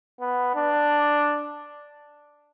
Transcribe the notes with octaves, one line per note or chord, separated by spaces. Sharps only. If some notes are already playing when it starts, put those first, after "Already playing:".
B3
D4